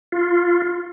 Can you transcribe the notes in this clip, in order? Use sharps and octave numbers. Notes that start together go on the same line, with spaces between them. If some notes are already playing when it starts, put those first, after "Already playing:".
F4